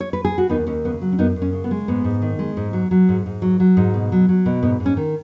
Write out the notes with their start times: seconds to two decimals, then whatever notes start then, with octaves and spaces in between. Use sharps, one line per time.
0.00 C#5
0.13 B4
0.25 G#4
0.38 F#4
0.49 D#2 B3 D#4
0.67 D#2 C#4
0.85 C#3 B3
1.02 F#3
1.13 C#4
1.19 F#2 B3 D#4
1.36 F#2
1.42 C#4
1.53 C#3
1.64 B3
1.71 G#3
1.88 G#2 B3
2.04 G#2
2.22 D#3
2.39 G#3
2.57 G#2
2.73 F#3
2.91 F#3
3.09 G#2
3.26 G#2
3.42 F#3
3.60 F#3
3.77 G#2
3.94 B2
4.12 F#3
4.29 F#3
4.46 B2
4.63 G#2 B3
4.80 G#2
4.86 C#4
4.97 D#3